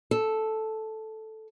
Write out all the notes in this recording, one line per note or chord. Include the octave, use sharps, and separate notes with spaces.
A4